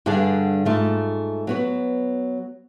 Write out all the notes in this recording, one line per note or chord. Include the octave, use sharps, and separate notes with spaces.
G2 D3 G#4 D5 F#5 G#5
G#2 A3 F4
F#3 B3 F#4